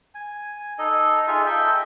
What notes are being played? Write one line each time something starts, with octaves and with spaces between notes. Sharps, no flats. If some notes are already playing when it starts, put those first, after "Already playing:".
G#5
D#4 A4 D#5
D#4 F4 G#4 E5
A4 D#5 E5 G5